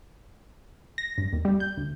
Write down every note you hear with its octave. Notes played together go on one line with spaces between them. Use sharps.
A#6
G2
D#2
G3
G6
D2